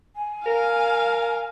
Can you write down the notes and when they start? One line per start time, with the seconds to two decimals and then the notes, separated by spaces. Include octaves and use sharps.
0.15 G#5
0.46 A#4 F5